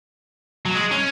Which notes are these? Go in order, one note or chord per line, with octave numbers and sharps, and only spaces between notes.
F#3
G#3
C#4